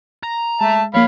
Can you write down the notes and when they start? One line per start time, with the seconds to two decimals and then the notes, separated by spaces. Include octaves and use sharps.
0.23 A#5
0.61 G#3 E5 A5
0.94 F3 A#3 C#5 F5 B5